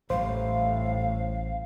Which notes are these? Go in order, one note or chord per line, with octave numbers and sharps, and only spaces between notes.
A1 A2 G3 C5 F5